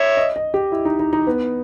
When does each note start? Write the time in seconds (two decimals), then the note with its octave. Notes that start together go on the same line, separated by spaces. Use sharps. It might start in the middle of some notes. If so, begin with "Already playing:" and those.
Already playing: C#5 E5
0.17 D#5
0.36 D#5
0.54 G4
0.72 E4
0.85 D#4
0.99 D#4
1.13 D#4
1.27 B3